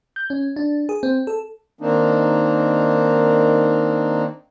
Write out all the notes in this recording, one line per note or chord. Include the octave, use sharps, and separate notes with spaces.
G6
C#4
D4
G#4
C4
A4
D#3 A#3 C4 D4 D#4